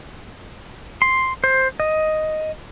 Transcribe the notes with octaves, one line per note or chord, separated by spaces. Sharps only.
C6
C5
D#5